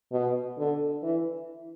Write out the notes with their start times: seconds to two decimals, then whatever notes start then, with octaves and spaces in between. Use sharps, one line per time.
0.12 B2
0.58 D3
1.02 E3